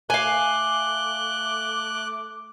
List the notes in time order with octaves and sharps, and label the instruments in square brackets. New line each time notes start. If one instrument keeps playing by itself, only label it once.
[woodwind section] A3 D6 [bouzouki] F5 G#5 [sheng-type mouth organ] F#6 [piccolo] G7